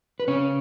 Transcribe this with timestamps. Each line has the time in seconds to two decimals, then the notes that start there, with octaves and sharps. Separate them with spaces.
0.20 B4
0.28 C#3 C#4 C#5